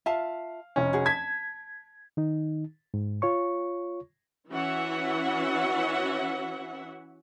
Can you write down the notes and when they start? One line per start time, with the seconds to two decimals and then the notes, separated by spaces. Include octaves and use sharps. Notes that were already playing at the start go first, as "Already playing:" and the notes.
0.06 F4 E5 F5 A5
0.76 F1 C#4
0.93 F#4 G#4
1.06 A5 G#6 B6
2.17 D#3 D#4
2.94 G#2
3.22 F4 C#5 C#6
4.50 E3 C#4 F#4 E5 F#5